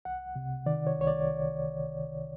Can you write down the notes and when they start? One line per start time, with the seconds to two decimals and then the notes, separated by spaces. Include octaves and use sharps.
0.05 C2 F#5
0.36 C3
0.66 D#3 D5
0.87 C#5
0.97 C2 C#5
1.07 D5